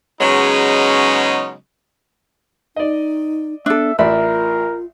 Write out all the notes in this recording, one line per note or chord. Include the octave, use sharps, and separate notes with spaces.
C#3 F#3 G#3 B3 C#4 D#4
D#4 D5 D#5
B3 D4 A4 E5
A1 F4 A#4 D5 E5 B5